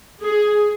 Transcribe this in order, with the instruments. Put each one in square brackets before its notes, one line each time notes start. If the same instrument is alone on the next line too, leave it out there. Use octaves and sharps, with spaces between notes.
[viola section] G#4